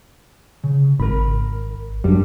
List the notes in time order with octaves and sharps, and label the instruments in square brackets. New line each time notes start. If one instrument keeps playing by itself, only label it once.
[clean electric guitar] C#3
[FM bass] G#1 [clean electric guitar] A#4 B5
[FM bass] F#2 [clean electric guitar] G3 D4